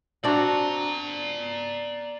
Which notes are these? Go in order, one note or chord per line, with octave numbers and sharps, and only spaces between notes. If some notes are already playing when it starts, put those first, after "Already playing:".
C4 D4 F#4 D5 A#5